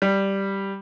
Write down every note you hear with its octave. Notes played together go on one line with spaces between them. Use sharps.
G3